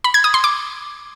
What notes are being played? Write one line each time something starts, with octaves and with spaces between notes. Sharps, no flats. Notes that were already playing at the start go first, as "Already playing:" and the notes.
B5
G#6
D#6
C6
D6